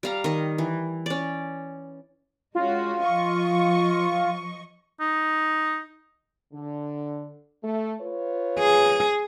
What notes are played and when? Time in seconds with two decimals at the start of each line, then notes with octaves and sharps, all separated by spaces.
0.03 G3 F5 A#5
0.24 D#3 D#5
0.58 E3
1.06 C#4 D5
2.55 G#3 C#4 F4 F#4
3.03 F3 D#5 C#6
5.01 D#4
6.53 D3
7.63 A3
8.01 F4 B4 C#5
8.59 G#4